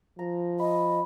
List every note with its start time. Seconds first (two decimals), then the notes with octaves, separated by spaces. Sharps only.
0.19 F3 A#5
0.59 D#5 B5